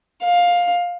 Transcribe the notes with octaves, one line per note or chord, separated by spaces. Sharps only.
F5